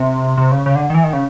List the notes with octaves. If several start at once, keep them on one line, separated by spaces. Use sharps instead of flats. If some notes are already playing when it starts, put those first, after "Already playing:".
Already playing: C3
C3
C#3
C#3
D3
D#3
E3
D#3
C#3